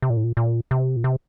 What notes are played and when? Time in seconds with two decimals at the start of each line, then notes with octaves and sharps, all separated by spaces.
0.02 C3
0.10 A#2
0.17 A2
0.24 A#2
0.37 A#2
0.71 C3
0.96 A#2
1.04 C3